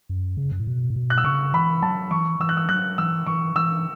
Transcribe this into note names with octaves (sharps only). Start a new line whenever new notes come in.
F#2
C#3
F#2
A2
B2
A2
B2
F#6
E6
C#3 C#6
E3 B5
F#3 A5
E3 C#6
E3 E6
F#6
E6
F#3 F#6
E3 E6
E3 C#6
E3 E6